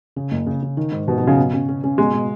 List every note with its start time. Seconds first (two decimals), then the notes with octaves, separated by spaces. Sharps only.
0.16 C#3
0.31 F#1
0.46 C#3
0.62 C#3
0.77 D#3
0.92 G#2
1.07 B2 D#3
1.18 B2
1.23 C#3 F#3
1.38 B2
1.53 C#4
1.68 C#4
1.83 C#4
1.98 B2 G#3
2.13 B2